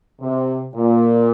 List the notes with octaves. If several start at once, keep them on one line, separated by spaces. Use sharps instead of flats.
C3
A#2